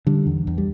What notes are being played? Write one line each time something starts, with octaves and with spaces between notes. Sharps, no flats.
D3 G3
E2
E2
G3